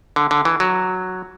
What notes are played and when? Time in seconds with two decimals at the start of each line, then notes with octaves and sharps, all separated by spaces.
0.16 D3
0.31 D3
0.45 E3
0.60 F#3